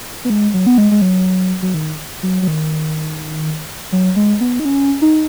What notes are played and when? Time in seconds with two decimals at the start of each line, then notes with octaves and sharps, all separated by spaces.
0.25 B3
0.30 G#3
0.54 F#3
0.66 B3
0.78 G#3
0.91 G#3
1.02 F#3
1.62 F#3
1.74 D#3
2.23 F#3
2.42 F#3
2.48 D#3
3.92 F#3
4.16 G#3
4.41 B3
4.60 D#4
4.65 C#4
5.02 D#4